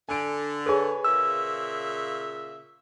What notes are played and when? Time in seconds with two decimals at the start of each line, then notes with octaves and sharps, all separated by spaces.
0.09 D3 G#5 D7
0.66 G#4 A4 B4 C#5 G#5
1.05 A#2 C#3 E5 E6